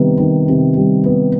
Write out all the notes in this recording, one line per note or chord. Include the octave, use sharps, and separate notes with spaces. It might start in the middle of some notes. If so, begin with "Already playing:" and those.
Already playing: C3 D#3 G3 B3
D#3
C3
G3
B3